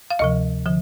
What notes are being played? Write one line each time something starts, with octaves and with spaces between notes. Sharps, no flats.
F5
D2 C3 F3 D#5
D3 F3